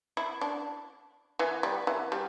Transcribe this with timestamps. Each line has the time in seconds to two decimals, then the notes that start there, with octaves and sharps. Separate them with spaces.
0.17 E4
0.41 D4
1.39 E3
1.63 G3
1.87 E3
2.12 G3